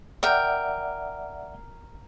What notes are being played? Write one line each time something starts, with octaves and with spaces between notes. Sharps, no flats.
A#4 D5 E5 F#5 G5